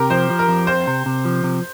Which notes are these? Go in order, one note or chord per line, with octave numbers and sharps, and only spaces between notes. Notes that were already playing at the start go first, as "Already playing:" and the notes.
Already playing: C3 G4 A#4
F3 C5
F3
A#4
F2
C4 C5
C3
C3
F3
C3